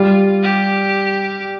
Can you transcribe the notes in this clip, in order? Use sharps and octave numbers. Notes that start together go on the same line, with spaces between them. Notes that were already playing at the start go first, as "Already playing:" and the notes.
Already playing: G3 F4
G4